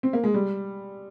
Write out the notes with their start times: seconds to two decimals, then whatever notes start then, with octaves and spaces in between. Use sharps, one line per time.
0.03 C4
0.13 A#3
0.24 G#3
0.34 G3